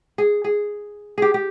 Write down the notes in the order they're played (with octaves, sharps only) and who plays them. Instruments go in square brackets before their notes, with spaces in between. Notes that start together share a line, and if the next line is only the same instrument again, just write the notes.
[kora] G#4
G#4
G4 G#4
G4